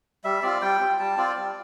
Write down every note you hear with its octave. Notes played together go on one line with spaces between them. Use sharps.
G3 E5
C4 F4 D5
G3 G5
C4 F4
G3 A5
C4 F4 D5
G3